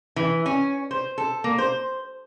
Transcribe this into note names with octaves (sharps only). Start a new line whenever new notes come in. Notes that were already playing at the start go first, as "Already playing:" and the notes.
E3
C#4
C5
A4
A#3
C5